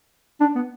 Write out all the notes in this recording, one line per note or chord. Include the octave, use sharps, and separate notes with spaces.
D4
B3